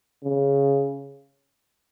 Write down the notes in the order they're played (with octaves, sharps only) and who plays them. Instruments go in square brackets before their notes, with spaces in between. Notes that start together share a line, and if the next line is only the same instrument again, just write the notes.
[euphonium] C#3